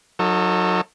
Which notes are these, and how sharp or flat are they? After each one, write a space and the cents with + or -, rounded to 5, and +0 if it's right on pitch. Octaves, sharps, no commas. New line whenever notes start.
F#3 -25 D#4 +0 A4 +25